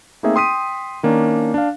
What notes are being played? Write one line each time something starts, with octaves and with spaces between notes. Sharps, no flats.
A3 A#3 C4 D#4 G#4 E5
G5 C6 D#6 B6 D#7
D#3 A#3 C#4 D4
D4 F5